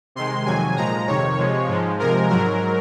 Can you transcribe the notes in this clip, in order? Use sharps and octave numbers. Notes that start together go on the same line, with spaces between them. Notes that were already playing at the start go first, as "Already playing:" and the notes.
C3 D#3 G#3 C6
F2 C3 D#3 F#3 G#5
A#2 F3 G#3 A#5
F2 C3 D#3 C#5
C3 F3 G#3
G#2 F3 G#3
C3 F3 G#3 A#4
G#2 F#3 A#4